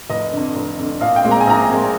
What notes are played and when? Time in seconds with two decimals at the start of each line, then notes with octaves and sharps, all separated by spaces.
0.10 F1 D#5
0.32 F2 D3
0.55 F1
0.78 F2 D3
1.00 A#1 F5
1.16 G5
1.24 A#2 G#3 C4
1.31 A#5
1.40 G#5
1.47 A#1 A#5
1.70 A#2 G#3 C4